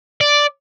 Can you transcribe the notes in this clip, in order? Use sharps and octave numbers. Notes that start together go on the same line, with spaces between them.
D5